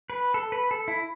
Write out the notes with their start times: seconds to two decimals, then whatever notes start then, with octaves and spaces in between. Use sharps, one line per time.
0.10 B4
0.34 A4
0.52 B4
0.71 A4
0.88 E4